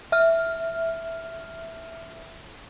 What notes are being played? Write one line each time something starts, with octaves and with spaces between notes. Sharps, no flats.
E5 F6